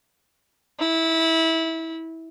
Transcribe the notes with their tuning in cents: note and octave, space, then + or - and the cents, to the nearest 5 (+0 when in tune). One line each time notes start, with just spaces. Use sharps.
E4 -20